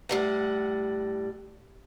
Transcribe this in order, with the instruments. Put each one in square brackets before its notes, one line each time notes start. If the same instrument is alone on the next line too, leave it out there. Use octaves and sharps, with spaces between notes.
[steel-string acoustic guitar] A2 G3 F#5